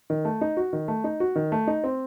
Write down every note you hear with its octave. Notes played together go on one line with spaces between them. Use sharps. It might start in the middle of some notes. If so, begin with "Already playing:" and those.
D#3
A3
D#4
F#4
D#3
A3
D#4
F#4
D#3
A3
D#4
C4